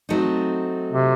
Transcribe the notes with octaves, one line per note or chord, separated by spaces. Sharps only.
F#3 A3 C4 D#4
C3